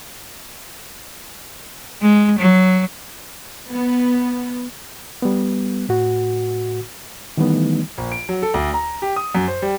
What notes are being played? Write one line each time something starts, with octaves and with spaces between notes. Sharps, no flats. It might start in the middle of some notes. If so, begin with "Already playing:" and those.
G#3
F#3
B3
G3 B3
A2 F#4
D#3 E3 G3 A3 B3 D#4
A#1
D7
F#3
A4
D2
A#5
G4
D#6
F#2
C5
G3